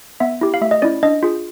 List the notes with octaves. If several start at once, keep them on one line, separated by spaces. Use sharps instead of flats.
B3 E5
E4 G4
F5
A3 E5
D#5
C#4 E4 D5
D4 D#5
F4 G#4